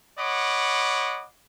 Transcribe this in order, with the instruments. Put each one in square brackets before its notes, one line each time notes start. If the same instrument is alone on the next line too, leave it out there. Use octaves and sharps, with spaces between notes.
[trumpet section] C#5 D#5 F#5 B5 D6